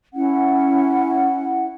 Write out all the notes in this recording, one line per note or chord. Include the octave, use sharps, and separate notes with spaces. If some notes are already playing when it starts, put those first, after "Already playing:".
C#4 E4 F#5